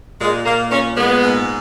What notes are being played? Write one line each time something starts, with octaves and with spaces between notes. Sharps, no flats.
A#2 G#3
A#2 A#3
A#2 A#3 C#4
A#2 G#3 B3
G#2